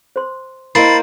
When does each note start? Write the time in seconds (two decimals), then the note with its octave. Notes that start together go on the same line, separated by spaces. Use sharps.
0.16 C5 C6
0.75 A#3 E4 A#4 C5 D#5 B5 A6 C7